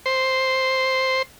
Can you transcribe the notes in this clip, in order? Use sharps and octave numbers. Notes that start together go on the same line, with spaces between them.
C5